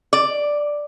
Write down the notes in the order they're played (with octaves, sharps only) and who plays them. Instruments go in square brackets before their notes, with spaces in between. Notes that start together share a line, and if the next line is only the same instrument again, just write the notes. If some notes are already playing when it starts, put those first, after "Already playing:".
[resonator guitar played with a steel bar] D5